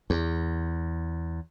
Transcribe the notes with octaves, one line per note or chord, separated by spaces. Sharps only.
E2